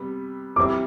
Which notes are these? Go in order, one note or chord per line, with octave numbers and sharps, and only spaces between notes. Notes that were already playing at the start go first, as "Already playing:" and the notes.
Already playing: C3 G3 B3
C3 G3 C4 E4 D6